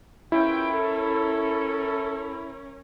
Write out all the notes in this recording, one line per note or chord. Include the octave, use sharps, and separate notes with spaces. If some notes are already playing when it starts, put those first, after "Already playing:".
E2 C#4 E4 F4 A#4 G5
A4